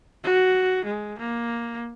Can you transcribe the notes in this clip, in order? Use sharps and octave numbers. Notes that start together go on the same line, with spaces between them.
F#4
G#3
A#3